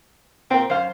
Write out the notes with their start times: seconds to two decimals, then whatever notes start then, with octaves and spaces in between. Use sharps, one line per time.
0.50 A#2 C4 A#4
0.70 F#2 C5 F5